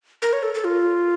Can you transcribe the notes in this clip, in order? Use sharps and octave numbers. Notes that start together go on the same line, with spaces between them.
A#4
C#5
A4
A4
F4